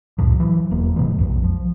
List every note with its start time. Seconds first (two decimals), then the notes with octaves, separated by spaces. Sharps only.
0.18 C#2 F#2 A#2 F3
0.40 E3 F#3
0.71 E1 A#3
0.96 G#2 C3 E3 G#3
1.19 B1 F2
1.43 F3